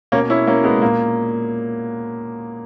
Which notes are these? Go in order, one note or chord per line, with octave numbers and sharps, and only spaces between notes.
B2 A#3 C#4
C#4 E4
A#3 C#4
G#3 B3
A#2 A#3